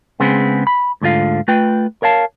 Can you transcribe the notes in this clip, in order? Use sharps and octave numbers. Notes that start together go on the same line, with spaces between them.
C#3 G#3 B3 C4
B5
D2 G#2 D3 F4 F5
A3 F4 B4 G5
A#4 C#5 F5 A5